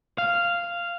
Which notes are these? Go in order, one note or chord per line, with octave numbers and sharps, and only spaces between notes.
F5